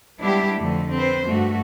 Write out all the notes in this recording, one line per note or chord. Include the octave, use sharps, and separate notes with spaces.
G3 G#3 B3 D4 E4 G4
F2 D3 A3
C4 B4 C5
G2 A3 F#4